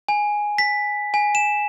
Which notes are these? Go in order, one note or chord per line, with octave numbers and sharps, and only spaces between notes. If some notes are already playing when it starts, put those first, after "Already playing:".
G#5
B6
G#5
E7